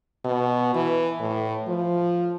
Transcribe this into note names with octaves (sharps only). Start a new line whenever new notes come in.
B2
E3
A2
F3